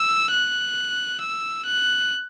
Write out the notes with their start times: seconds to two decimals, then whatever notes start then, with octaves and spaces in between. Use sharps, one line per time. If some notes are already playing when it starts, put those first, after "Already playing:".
Already playing: E6
0.31 F#6
1.21 E6
1.66 F#6